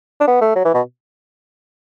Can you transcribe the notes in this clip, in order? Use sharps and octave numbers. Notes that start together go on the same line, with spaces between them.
D4
B3
A3
F#3
E3
B2